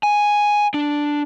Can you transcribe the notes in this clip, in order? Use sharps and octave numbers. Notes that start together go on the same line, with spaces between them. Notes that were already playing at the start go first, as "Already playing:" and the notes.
G#5
D4